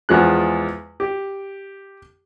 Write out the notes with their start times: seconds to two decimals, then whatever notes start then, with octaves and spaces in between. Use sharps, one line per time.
0.09 E2 F3 G#3 F#6
1.00 G4